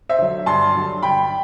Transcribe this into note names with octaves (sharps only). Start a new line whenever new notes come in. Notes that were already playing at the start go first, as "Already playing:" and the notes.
C5 E5
D3 F#3
G2 A5 C6
D3 F#3
G2 G5 B5